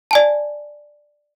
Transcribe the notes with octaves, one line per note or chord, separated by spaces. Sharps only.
D5 G#5 A5